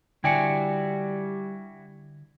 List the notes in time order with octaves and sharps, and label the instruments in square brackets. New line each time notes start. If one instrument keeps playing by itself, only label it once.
[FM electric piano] D3 [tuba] G3 [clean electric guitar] E4 F#4 D5 [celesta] G5 G#5 C#7